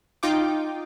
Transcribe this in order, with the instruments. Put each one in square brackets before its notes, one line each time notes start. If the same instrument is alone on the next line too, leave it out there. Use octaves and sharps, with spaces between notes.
[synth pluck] D#4 F4 G5 D6